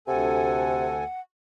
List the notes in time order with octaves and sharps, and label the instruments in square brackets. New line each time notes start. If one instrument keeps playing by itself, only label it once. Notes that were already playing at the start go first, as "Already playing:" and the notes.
[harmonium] D2 A4 G#5 [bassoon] C3 [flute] F#5